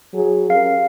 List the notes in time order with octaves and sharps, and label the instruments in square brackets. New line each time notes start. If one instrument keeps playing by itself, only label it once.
[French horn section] F#3 G#4
[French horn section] C#4 G4 A#4 [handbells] F5